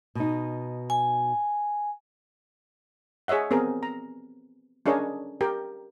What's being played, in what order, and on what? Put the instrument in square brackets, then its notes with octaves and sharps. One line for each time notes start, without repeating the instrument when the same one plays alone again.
[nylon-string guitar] B2 D#4
[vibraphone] G#5
[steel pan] G#4 C#5 D#5 E5 F#5
B3 C4 G#4 A#4
A#5
C#4 D4 G#4 A#4 C#5 D#5
G4 A#4 G5